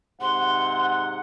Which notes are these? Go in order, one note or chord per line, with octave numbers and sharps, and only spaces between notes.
G#2 C3 F#5 C6